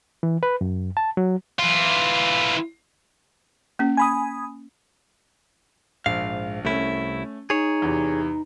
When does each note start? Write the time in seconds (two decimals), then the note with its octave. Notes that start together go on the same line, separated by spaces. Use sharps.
0.23 E3
0.43 B4
0.61 F#2
0.97 A5
1.17 F#3
1.59 E3 F4
3.79 A#3 C#4
3.97 G#5 B5 D#6
6.06 A#1 G#2 F5
6.65 C2 A3 C#4 E4
7.50 D#4 G#4 C#5
7.82 E2 C3